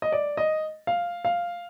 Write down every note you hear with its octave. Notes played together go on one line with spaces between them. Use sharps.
D#5
D5
D#5
F5
F5